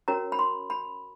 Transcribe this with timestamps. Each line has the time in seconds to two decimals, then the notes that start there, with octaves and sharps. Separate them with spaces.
0.08 C#4 F#4 A#4 C#5 A#5
0.32 B5
0.39 C6
0.70 B5